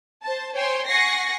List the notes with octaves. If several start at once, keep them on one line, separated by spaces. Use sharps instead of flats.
C5 A5
C5 C#5 G5 G#5 C6
F#5 G#5 C#6 A#6 C7